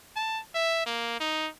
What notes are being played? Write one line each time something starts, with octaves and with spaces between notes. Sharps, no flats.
A5
E5
A#3
D#4